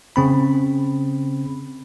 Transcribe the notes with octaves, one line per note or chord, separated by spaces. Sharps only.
C#3 C4 B5